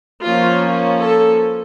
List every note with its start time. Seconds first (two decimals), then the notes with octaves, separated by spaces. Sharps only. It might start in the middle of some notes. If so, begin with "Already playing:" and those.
0.24 F3 A#3 C#4 F4
1.02 A4